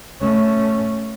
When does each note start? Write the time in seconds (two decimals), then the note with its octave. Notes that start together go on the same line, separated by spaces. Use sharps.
0.21 A3 C#4